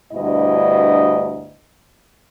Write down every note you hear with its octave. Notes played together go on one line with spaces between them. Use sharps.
D2 G2 B2 E4 D#5